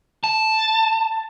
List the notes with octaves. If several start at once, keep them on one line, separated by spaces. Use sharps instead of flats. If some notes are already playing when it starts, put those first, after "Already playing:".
A5